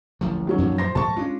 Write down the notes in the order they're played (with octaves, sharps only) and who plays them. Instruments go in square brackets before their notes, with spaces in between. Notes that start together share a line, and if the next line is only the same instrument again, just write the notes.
[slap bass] D1 A1 F3
[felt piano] D#3 F#3 C#4
[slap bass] F#2 A#2 F3
[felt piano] C5 C6 A#6
[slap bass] G#2 F3 [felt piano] A5 C#6
[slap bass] G#3 C#4 D4 [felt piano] F4